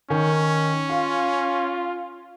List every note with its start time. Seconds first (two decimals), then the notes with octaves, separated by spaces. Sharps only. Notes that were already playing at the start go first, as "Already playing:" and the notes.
0.10 D#3 C#4
0.90 F4 F5